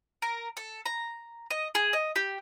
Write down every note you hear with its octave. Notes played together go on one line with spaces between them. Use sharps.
A#4
A4
A#5
D#5
G#4
D#5
G4